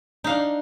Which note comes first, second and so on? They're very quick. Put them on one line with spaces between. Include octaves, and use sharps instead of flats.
D#4 F5 D4